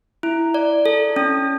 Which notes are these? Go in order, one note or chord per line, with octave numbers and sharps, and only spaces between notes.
E4
D5
A4
C#4